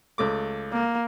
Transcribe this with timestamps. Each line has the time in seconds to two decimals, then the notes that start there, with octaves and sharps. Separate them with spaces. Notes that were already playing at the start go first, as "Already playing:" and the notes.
0.18 C#2 A3 D6
0.72 A#3